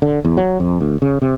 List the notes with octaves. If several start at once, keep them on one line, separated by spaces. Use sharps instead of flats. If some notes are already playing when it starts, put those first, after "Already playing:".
D3
E2
F#3
F2
D2
C#3
C3